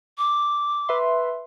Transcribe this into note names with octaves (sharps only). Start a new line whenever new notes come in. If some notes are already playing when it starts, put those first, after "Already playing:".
D6
B4 E5 C6